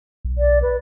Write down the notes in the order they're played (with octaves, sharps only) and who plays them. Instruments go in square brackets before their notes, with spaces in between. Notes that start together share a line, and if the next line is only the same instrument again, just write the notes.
[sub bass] B1
[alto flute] D5
B4